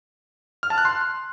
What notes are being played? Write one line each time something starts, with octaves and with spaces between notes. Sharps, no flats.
F6
A5
F#6
C6